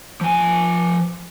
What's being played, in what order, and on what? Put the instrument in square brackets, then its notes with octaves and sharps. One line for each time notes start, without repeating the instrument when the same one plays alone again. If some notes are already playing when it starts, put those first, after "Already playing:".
[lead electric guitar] F3 G#5